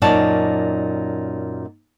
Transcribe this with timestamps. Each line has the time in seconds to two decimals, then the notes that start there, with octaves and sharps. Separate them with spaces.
0.02 F#2 A#2 D#4 C#5 D5 A5